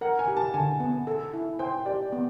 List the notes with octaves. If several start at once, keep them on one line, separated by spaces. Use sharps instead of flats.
A#4 F#5
G#5
G4
A5
D3 G#5
B3
A4
E4
C5 G5
G4 D5
B3